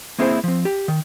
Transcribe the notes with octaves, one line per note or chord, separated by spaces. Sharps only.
A#3 C4 E4 G#4 A4 C5
F3 C4
G4
D#3